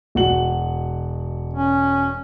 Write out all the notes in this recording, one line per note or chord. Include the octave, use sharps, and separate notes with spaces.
E1 F#4 F#7
C#4